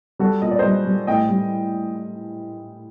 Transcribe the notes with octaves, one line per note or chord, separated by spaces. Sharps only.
G3 F#4 A4
A#2 D#5
D5
C5 D#5
G3
G3
A2 D#5 G5
G3